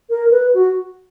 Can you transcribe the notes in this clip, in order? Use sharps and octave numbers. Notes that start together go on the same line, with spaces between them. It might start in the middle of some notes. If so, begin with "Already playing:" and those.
A#4
B4
F#4